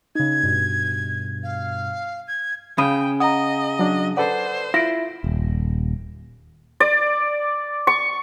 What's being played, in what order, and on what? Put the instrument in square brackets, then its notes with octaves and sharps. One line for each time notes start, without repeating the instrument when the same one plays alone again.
[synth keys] C#3 D#4 [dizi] G#6
[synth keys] G2 B2
[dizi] F5
G#6
[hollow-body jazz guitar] C#3 [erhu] G5 [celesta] B5 D#6 D#7
[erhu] D#5 [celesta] F#5 A#5 [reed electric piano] D#6
[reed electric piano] F#3 D4
[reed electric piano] A4 B4 D5 [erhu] C5 [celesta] F#5
[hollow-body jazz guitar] E4 [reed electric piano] F4 [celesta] A#6 D7
[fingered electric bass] D#1
[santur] D5
C#6